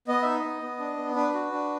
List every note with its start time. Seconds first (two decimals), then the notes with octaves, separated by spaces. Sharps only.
0.08 B3 D#5
0.22 D#4 E5
0.34 D#5
0.44 B3
0.62 B3
0.80 D4
0.97 B3
1.15 D4 B4
1.34 F#4
1.52 D4